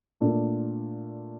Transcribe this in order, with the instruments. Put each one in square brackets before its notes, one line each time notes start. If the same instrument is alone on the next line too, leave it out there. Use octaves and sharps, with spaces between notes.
[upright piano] A#2 A3 D4 F4